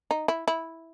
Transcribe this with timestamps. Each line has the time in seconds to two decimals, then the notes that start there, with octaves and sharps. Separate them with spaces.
0.11 D#4
0.28 E4
0.48 E4